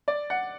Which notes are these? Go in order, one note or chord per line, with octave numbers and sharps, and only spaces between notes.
D5
F#5